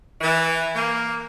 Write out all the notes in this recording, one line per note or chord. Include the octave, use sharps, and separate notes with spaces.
E3
A#3